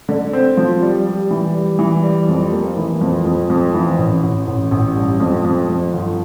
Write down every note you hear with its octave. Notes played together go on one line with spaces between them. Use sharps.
D3
C4
F3
G3
G3
E3
G3
E3
G3
F2
A#3
E3
F2
F2
F2
E3
A1
A1
A1
A1
G2
F2
F2
F2
G1